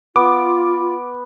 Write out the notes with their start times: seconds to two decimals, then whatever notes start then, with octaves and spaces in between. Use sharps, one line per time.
0.16 B3 F4 D6